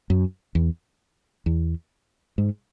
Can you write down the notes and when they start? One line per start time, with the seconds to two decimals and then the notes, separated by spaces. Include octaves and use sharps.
0.10 F#2
0.55 E2
1.46 E2
2.38 G#2